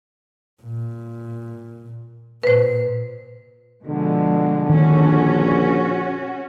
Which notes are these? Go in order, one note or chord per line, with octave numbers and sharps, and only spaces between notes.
A#2
A#2 B4 C5
B2 D3 F3 G#3
A#1 D#3 C#4 F#4